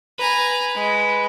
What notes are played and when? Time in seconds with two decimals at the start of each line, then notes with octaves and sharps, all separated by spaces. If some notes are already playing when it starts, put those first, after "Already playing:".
0.19 B4 G#5 A#5
0.75 G#3